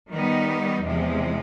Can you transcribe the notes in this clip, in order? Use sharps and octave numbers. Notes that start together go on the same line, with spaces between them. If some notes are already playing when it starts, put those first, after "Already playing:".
D#3 G3 B3 D#4
E2 C3 F3 G#3